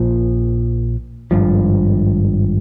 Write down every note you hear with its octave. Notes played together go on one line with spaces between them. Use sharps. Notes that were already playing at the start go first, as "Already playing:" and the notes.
Already playing: A#1 A#2 F3
G#1 G2 F3